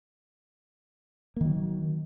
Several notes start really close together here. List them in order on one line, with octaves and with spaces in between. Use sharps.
A#3 D#3 F#3